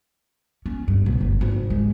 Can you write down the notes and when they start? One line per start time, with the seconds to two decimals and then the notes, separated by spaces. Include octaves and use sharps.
0.66 C#4
0.88 G2
1.06 B1
1.21 G1
1.41 G#1
1.70 G#3